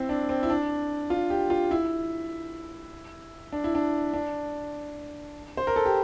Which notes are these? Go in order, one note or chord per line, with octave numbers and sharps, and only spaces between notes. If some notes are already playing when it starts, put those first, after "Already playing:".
Already playing: C4 E4
D4
C4
E4
D4
F4
G4
F4
E4
D4
E4
D4
D4
C5
A#4
A4
G4